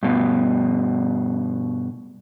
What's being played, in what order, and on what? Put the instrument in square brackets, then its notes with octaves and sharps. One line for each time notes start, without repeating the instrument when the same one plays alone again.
[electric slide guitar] G2 B2